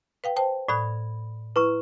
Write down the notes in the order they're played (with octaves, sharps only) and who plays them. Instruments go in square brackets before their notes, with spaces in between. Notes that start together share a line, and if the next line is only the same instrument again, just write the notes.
[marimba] B4 F5 G5
C5 G5 A5
[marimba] A2 D#6 F#6 [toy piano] D5 B5
[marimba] E4 [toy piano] B4 A#5 C#6